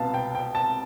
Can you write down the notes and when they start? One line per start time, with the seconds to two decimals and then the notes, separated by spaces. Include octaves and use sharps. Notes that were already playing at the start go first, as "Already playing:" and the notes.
Already playing: C2 B2 B3 F5 A5
0.14 G5
0.35 G5
0.55 A5